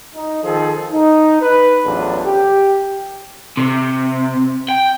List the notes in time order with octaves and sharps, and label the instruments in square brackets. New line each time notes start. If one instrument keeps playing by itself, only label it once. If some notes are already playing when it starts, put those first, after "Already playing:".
[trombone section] D#4
D#3 F3 G#4 A4
D#4
B4
A1 E2 F3 F#3 D4 A4
G4
[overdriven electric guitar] C3
G5